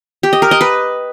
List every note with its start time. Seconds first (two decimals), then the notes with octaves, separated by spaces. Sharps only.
0.23 G4
0.33 D#5
0.42 A#4
0.51 D#5
0.61 B4